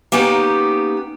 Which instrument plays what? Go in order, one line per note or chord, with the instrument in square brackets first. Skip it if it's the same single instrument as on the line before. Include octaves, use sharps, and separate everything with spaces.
[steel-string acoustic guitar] A#3 B3 C#4 D#4 G4